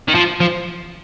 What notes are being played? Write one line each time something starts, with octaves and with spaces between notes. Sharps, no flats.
D#3
F3
F3